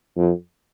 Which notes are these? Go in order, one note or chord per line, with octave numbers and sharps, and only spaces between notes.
F2